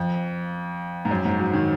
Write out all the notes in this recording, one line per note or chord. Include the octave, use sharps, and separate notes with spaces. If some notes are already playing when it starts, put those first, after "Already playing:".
Already playing: F2
G#2
F#2
G#2
F#3
D#3